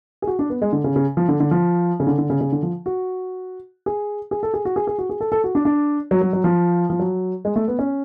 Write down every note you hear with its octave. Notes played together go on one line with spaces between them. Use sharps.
G#4
F#4
D4
B3
G#3
D3
C#3
C#3
F3
D3
D3
F3
C#3
D3
D3
C#3
C#3
D3
F3
F#4
G#4
G#4
A4
G#4
F#4
G#4
G#4
F#4
G#4
A4
A4
F#4
D4
D4
F#3
F#3
F#3
F3
F3
F#3
G#3
A3
B3
C#4